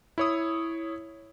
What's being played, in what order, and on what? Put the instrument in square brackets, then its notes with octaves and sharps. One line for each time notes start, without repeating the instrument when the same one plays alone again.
[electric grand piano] E4 C#5 D#6